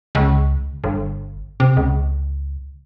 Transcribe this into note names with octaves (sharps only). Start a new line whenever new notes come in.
C#2
G1
C3
C#2